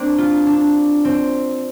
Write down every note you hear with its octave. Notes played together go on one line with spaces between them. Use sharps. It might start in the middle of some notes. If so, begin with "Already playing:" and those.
Already playing: A#3 C4 D4
F4
D4
C4